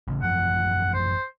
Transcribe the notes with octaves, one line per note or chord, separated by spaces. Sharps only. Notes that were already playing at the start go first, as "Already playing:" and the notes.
A1 C#3
A1 F#2 F3 F#5
C5